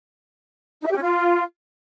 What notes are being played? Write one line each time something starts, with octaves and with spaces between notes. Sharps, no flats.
D#4
E5
G4
C#4
F4